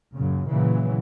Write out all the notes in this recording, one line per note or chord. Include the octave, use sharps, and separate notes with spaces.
F#2 A#2 C#3
A#2 C#3 E3 F#3